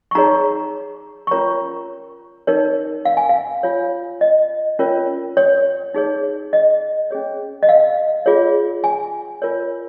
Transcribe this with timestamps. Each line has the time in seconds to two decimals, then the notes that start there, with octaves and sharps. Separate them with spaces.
0.11 C#6
0.15 D#4 G#4 C#5 A#5
1.27 C#6
1.31 C#4 F4 A#4 C#5 A#5
2.47 D#4 A#4 C#5
3.05 F5
3.17 G#5
3.29 F5
3.63 F4 C#5
4.21 D#5
4.79 C#4 F4 A#4 C#5
5.37 C#5
5.94 D#4 G#4 C#5
6.53 D#5
7.11 C#4 G#4 C#5
7.63 D#5
7.69 F5
8.26 F4 G#4 C#5
8.84 G#5
9.42 F4 A#4 C#5